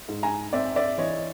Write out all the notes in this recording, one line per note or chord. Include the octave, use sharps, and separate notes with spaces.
G#2
G#5 A#5
C4 D5 E5
D5 E5
E3 C#5 D#5